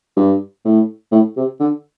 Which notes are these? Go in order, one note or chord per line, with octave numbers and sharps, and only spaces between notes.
G2
A2
A2
C3
D3